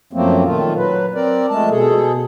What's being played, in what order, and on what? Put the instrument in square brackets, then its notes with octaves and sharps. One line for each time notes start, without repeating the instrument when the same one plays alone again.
[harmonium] F#2 F3 F#3 A3 A#3 C4
A#2 D#3 A3 F4
F#3 B4
C4 A#4 D5
F2 G#3 A3 A5
B2 G#4 A4